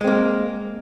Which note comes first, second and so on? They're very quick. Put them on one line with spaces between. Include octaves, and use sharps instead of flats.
G#3 C4 A#3